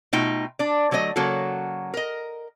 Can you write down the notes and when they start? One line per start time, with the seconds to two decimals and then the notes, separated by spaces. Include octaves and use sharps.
0.13 B2 A3 D#4 F4 G5
0.59 D4 D5
0.91 D3 F#3 A3 D4 D#5
1.16 C#3 F#3 A#3 F#4 A4
1.94 A#4 D#5